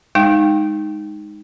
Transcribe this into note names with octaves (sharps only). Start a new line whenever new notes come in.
G#3 D#4 G5